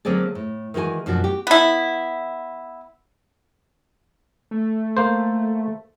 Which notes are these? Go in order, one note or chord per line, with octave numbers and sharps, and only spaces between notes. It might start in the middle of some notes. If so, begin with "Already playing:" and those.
D3 F#3 A#3 C4 G#4 D5
A2
D#3 E3 G#3 F#4 G#5
F#2 B2 F3 D4 F#4
F#4 G4
B3 E4
A3
A#3 C5